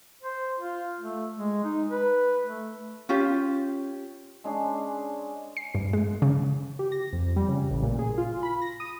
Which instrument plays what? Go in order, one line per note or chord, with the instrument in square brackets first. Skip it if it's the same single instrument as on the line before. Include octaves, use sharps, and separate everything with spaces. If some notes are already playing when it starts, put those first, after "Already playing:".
[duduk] C5
F4
A3
G#3
D#4
B4
A3
[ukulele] C#4 F4 G4
[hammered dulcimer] G#3 C#4 D4 G#4
[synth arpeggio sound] C7
G2
G#3
C#3
[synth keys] G4
A#6
F2
G3
C#3
A1
A#2
G#4
F4
B5
A#6
D#6